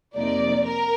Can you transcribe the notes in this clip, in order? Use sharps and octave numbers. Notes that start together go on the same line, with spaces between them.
F2 C3 F3 A#3 D#4 D5
A#4